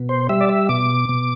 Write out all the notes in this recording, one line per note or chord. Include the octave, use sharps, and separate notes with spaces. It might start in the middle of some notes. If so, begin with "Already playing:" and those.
Already playing: B2
C5
G3 E5
D5
E5
B2 D6
B2